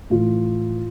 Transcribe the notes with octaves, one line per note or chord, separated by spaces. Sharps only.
A2 E3 F4